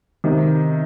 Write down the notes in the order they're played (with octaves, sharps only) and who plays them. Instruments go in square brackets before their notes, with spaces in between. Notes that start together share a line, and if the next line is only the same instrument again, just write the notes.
[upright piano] C3 D#3